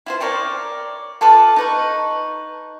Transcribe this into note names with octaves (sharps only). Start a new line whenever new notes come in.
E4 F4 C5
A#4 C#5 D5 G5
F4 A4 B4 D6
D#4 B4 C#6